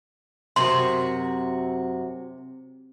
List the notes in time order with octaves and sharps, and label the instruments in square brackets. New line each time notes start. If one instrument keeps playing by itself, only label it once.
[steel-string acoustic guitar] F#2 F#4 [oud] C3 [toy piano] C6